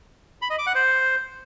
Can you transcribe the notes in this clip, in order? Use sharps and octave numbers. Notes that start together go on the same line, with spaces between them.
B5
D#5
D6
F#5
C5